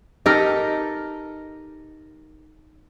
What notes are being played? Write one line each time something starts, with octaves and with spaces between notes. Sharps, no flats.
D#4 G4 A4 A#4